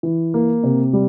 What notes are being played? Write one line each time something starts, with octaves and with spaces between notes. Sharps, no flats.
E3
A#3
C3
G3